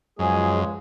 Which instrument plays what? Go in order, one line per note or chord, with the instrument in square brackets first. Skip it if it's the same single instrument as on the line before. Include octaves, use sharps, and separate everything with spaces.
[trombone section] C#2 F3 G#3 [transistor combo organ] F#2 [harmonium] G#4